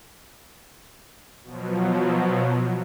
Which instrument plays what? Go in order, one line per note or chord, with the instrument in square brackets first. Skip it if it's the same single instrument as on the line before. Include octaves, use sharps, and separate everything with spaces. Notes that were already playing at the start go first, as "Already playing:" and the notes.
[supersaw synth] B2 F3 F#3